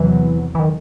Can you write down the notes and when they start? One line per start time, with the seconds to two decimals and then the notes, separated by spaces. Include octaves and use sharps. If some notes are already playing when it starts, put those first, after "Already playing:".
Already playing: E2 C3 E3 F#3
0.55 E3
0.59 D#3